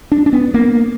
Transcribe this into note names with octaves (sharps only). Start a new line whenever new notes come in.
D4
D4
B3
A#3